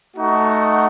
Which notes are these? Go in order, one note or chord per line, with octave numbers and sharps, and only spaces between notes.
A3 D#4 F#4